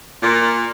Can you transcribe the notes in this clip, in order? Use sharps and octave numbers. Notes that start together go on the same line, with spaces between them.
A#2